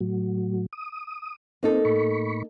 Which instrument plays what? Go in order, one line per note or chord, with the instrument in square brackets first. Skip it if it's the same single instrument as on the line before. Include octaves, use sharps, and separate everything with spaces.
[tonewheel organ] A2 F#3
D#6
[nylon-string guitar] A#3 D#4 A4 [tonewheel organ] C4
[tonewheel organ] A2 B5 C#6